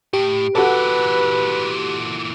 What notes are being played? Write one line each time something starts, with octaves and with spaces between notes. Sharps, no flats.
A2 G4
A#2 E3 F#4 A4 B4